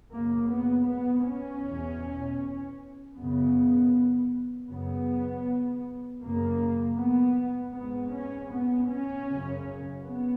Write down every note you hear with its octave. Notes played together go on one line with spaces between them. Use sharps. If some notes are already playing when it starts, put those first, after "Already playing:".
F#2 C#3 A#3
B3
B3
C#4
E2 B2
F#2 C#3 B3
F#2 C#3 B3
F#2 C#3 A#3
B3
G#2 B3
C#4
B3
C#4
F#2 C#3
B3